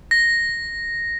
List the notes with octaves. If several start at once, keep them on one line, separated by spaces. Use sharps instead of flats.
A#6